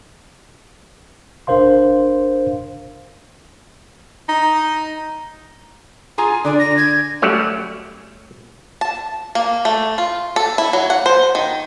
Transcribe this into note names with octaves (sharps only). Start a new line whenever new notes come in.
G1 D4 A#4 C5 F5 C6
D#4
F4 G#4 G#5 A#5
D3 D5
A#6
G#6
F#3 G3 A3 C#4
A5
A#3
A3
F4
A4
E4
F#3
F#5
C5
D#3